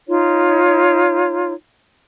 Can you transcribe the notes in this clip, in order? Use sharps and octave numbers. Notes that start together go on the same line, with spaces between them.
D#4 F4 C#5